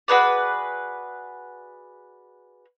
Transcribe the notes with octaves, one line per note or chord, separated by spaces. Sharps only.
F#4 G#4 B4 D5